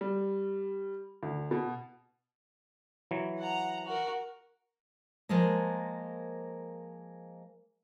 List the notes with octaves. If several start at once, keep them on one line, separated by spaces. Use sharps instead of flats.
G3
D2
B2
E3 F#3
F#5 A#5
F#4 A#4
F3 G#3 A#3